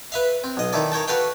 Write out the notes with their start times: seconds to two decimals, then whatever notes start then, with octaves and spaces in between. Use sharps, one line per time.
0.12 B4 E5 F5
0.44 C4
0.57 B1 D#5
0.73 D#3 D#4 E4 A4 D5
0.92 A#4 C#5 G5 A5
1.08 F#4 A4 B4 F5 G5